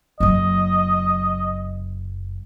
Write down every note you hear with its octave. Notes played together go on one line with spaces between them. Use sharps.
F#1 F#3 D#5